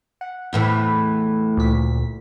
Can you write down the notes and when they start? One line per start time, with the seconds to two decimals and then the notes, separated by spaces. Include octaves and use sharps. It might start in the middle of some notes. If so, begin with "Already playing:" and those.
0.21 F#5
0.53 E2 A2 E3
1.57 D2 A#2 B6